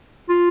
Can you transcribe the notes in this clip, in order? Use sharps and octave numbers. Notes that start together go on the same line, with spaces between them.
F4